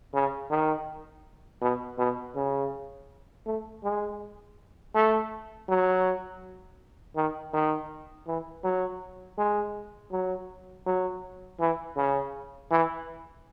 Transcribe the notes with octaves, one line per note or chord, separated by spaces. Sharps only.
C#3
D#3
B2
B2
C#3
A3
G#3
A3
F#3
D#3
D#3
E3
F#3
G#3
F#3
F#3
E3
C#3
E3